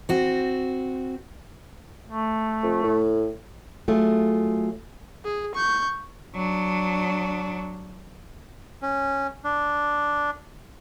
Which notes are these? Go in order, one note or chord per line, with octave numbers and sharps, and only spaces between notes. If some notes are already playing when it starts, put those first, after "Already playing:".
C4 F#4
A3
F2
A2
F#3 A3 F4 G#4
G#4
C#6 G6
F#3 D4
C#4
D4